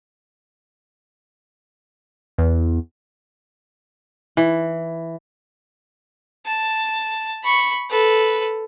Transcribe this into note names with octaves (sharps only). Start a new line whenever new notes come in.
E2
E3
A5
B5 C#6
A4 B4